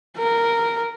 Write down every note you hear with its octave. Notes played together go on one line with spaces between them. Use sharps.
A#4